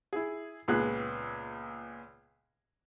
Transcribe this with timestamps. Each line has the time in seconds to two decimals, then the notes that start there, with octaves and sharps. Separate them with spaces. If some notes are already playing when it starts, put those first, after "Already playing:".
0.13 E4 G#4
0.68 C#2 A#2 B3 G#4 F#6